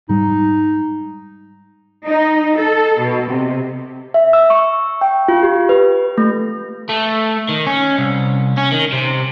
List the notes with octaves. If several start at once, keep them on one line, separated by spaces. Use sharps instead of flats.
G#2 G3 D#4
D#4
A4
B2
C3
E5
E6
C#6
G5
F4
G4
B4
A3
A3
D#3
C#4
C2
C#4
D#3
C3